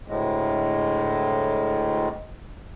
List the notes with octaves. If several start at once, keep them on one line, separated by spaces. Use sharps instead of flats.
D2 A2 G#3